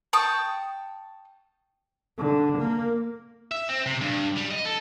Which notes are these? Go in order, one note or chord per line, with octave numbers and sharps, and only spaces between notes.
G5 A5 C#6 D#6
D3
A#3
E5
C4
C3
G2
G3
D#5
A4